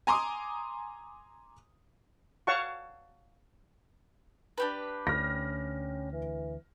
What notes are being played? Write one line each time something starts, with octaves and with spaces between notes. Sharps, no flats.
G#5 A#5 C6 D6 D#6
C#5 F5 F#5 A5 C#6
D4 G4 B4
D2 C#4 F6 A#6
E3